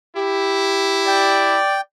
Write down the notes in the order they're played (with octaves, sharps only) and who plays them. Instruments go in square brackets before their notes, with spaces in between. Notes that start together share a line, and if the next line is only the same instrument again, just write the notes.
[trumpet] E4 [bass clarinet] G4
[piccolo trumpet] D5 [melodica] G5